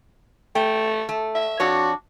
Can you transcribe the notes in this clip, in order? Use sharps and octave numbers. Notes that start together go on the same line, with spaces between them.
A3 G5
A3
E5
F2 D4 F#4 C#5